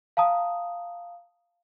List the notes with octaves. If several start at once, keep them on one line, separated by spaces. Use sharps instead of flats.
F5 A5 A#5 D#6